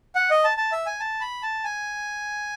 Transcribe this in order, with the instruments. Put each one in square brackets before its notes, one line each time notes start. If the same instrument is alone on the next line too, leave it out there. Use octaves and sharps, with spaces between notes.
[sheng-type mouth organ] F#5
D#5
A5
A5
E5
G#5
A5
B5
A5
G#5